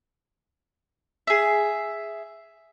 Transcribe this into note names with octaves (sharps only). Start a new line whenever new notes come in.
G#4 E5